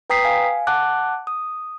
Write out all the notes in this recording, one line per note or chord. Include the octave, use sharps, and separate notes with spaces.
B4 G5 A#5 D#6 B6 C7
F5 G#5
F#5 A5 D6 F#6
D#6